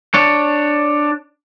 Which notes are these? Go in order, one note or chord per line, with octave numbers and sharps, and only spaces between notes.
D4 C#5